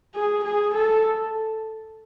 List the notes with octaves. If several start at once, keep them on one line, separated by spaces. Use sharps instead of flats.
G#4
G#4
A4